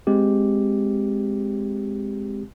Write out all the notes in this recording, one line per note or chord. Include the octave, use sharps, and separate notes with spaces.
G#3 C4 G4